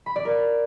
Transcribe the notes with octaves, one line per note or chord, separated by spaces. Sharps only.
B5
D5
A#4